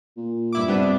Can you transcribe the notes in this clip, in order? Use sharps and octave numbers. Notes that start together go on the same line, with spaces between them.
A#2
G2 E4 D6
C3 G3 B3 D4